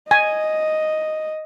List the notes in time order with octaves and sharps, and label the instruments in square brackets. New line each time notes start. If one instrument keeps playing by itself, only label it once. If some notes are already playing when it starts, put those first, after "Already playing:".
[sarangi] D#5 [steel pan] G#5